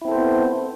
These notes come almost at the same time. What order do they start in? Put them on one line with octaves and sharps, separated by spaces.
E4 C4 A4 C5 B3